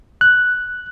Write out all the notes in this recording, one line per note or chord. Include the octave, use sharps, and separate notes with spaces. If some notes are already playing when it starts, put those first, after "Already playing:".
F#6